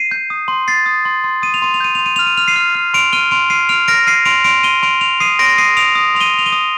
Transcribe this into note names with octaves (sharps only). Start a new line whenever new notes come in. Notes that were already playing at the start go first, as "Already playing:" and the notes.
Already playing: C7 D#7
G6
D#6
C6
C6 A6 C7
D#6
C6
C6
D#6 D#7
F7
C6 D#7
F7
G6 D#7
C6 F7
D#7
F6 F7
D#7
F6 F7
C7 D#7
F6
F6
C6 D7 F7
F6 D#7 G7
C6 D7 F7
F6 C7 D#7
F6 D7 F7
F6 A#6 D7
F6 C7 D#7
C6 D7 F7
C6 D7 F7
C6 D#7 G7
C6 D7 F7
C6 D7 F7
D#6 C7 D#7
C6 A#6 D7
D#6 C7 D#7
D#6 D7 F7
D#6
C6 F7
D#7 G7
C6 F7
D#7 G7
D#6